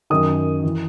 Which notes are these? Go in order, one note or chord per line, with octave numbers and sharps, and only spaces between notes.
F#2 D#3 D#6
E3